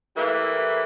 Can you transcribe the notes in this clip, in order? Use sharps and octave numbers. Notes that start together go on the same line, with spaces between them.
E3 G3 A3 A#3 E4 B4